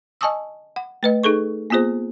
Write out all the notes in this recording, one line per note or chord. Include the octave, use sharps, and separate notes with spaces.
D#5 G#5 A5 C#6 D#6 E6
F#5
A3 B4 D#5
D#4 G#4 A4 C#6
A#3 B3 F4 G#4 C5